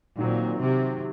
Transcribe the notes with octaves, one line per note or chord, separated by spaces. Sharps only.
A#2 D#3 F#3 C4
C3